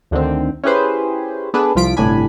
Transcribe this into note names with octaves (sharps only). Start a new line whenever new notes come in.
D2 D3 D#3 C4
C#4 E4 G4 G#4 B4 C5
B3 D4 G#4 A4 B4
C2 F3 F4 B6 D7
G1 A2 C3 D4 G#5 B5